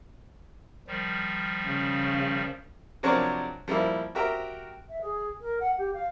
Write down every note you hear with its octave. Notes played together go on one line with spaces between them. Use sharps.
D#3 F3 G3
C#3
C3 F3 F#3 D4 A#4 C#5
F3 G3 A#3 E4
F#4 G4 A#4 E5 G5 A#5
E5
G#4
A#4
F#5
G4
F5